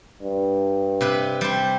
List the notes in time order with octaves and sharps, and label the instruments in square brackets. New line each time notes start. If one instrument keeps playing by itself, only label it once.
[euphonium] G2
[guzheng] C3 B4 B5
G3 C5